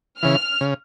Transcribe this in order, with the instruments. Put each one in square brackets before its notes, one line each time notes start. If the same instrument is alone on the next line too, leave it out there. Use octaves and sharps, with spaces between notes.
[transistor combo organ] C#3 E3 [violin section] F6
[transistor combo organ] C#3